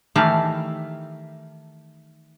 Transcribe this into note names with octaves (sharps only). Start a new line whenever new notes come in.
D#3 E3 G3 A3 F5